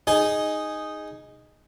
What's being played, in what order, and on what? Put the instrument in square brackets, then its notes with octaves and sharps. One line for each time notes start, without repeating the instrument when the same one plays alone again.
[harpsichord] D#4 G#4 D#6